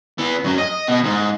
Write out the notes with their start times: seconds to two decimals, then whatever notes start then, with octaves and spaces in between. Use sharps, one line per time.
0.18 B3 E4
0.44 F#2 F#3
0.58 D#5
0.88 B2
1.04 G#2